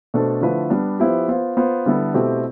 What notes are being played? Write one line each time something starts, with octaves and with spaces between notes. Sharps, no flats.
B2 A3 D4 A4 C5
D3 F3 A3 E4 B4
G3 B3 D4
F3 B3 E4 G4 C5
B3 F4 C5
B3 F4 C5
D3 G3 B3 E4 A4
B2 A3 C4 E4 G4